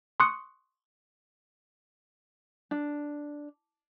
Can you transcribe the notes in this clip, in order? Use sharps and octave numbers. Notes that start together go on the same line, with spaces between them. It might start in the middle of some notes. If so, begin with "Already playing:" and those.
C6 C#6 D#6 F#6 C#7
D4